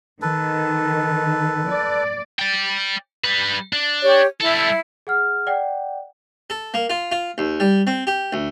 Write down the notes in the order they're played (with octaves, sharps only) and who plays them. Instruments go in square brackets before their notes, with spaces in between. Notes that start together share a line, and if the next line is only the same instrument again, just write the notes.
[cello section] D#3 [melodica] A4 B4
[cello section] D5
[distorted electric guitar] D5 G5
G3 B4
D4
[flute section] G4 C#5
[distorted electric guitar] G3 A4 [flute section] E4
[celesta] G#4 F#5 F6
D5 F#5 G5
[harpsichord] A4
A#3
F4
F4
D#2
G3
C4
G4
D2